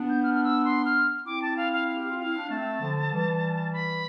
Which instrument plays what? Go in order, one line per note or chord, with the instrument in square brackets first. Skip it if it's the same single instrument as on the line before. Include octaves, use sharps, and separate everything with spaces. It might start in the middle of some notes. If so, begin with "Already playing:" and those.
Already playing: [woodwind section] B3 D4
[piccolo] G6
F6
F6
E6
C6
F6
[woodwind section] C4 E4 [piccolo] D6
[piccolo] A5
F5
F5
F5
[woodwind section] G4
F4
[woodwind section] E4 [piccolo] F5
[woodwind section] D4
[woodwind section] A3 C4 [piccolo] A5
[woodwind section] D3 F3
E3 G3
[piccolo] B5